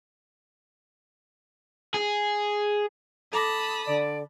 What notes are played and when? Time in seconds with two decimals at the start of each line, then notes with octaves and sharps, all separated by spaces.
1.94 G#4
3.33 A4 A5 B5 D6 D#6 A#6
3.87 D3 D5